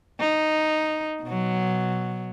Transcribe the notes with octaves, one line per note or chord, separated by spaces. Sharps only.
D#4
B2 F#3